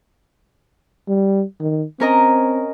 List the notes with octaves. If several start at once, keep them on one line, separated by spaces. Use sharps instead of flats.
G3
D#3
C4 C#4 A#4 D#5